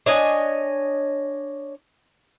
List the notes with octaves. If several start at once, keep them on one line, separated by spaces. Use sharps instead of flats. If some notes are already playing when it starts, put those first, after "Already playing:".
D4 C#5 D#5 G#5